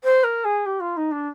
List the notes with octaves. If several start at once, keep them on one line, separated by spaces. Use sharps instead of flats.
C5
A#4
G#4
G4
F4
D#4
D4